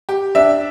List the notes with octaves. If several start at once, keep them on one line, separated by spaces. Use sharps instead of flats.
G4
D4 E5